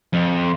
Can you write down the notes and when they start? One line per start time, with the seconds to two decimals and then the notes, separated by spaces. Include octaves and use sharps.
0.13 F2